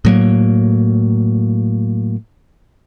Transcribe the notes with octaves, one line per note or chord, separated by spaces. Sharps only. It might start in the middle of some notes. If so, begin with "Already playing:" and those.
A2 F#3 A#3